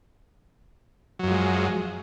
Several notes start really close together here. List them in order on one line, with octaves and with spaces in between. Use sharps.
F#3 F#2 F3 G#3